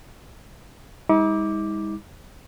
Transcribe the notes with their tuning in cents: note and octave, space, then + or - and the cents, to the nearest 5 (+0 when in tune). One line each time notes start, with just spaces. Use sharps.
G#3 -45 D#4 +45 D6 +0